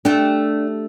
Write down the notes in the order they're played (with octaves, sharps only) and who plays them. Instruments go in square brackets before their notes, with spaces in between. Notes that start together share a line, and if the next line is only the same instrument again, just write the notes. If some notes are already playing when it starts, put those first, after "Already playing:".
[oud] A3 G4 [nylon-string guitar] D4